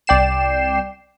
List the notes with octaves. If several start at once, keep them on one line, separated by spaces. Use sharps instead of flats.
C2 D5 G5 C7 E7